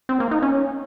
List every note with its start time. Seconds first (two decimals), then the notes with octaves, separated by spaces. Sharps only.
0.09 C4
0.20 A#3
0.31 D#4
0.42 C#4